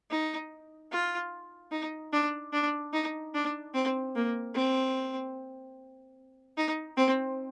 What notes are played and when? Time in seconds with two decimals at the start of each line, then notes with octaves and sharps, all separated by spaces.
0.11 D#4
0.92 F4
1.72 D#4
2.13 D4
2.53 D4
2.93 D#4
3.34 D4
3.74 C4
4.15 A#3
4.54 C4
6.57 D#4
6.97 C4